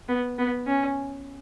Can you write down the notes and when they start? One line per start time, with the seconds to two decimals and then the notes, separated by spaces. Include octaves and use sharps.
0.08 B3
0.38 B3
0.67 C#4